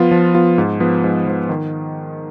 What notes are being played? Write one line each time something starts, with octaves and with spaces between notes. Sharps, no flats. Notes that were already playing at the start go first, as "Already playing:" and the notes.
Already playing: F3 B3 F4
F3
B3 F4
G#2
F3 B3
G#2
F3 B3
D#3